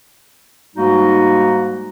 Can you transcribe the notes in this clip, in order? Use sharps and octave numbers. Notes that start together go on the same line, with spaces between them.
G#2 G3 G#3 A#3 D#4 F#4